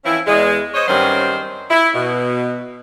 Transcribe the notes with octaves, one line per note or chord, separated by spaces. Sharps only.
E3 F3 C4 C#4 E4
E2 G#3
C5 C#5 D#5
G2 D#3 F#3 C4 C#4 C5
E4
B2